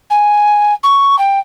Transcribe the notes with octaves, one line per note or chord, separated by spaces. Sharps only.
G#5
C#6
G5